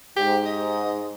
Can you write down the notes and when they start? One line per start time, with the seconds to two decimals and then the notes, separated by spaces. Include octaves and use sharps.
0.17 G#2 G4
0.45 D#5